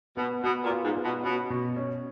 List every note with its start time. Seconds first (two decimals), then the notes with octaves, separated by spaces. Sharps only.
0.17 B2 B3
0.43 B2 B3
0.64 A#2
0.71 F4
0.83 G#2
0.97 B3
1.03 B2
1.23 B2 C#4
1.50 B2
1.76 C#4